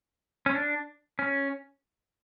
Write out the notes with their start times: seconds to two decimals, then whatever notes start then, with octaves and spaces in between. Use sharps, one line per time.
0.46 C#4
0.55 D4
1.19 C#4